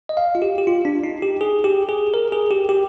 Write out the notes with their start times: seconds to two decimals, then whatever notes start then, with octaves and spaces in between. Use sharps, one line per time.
0.09 D#5
0.17 F5
0.35 F4
0.42 G4
0.58 G4
0.67 F4
0.85 D4
1.04 D#4
1.22 G4
1.41 G#4
1.64 G4
1.89 G#4
2.14 A#4
2.32 G#4
2.51 G4
2.69 G4